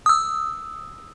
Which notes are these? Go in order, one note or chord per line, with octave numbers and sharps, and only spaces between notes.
D#6 E6